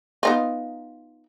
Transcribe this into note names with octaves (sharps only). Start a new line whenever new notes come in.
B3 D#4 F4